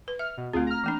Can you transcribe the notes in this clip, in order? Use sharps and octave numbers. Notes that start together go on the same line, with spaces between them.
B4
E5 F6
B2
D2 A3 C4 F4 G#4
A#5 F6
E3 A#3 D4